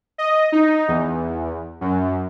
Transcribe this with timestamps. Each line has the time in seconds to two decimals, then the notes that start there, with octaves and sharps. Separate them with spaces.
0.18 D#5
0.52 D#4
0.88 E2
1.81 F#2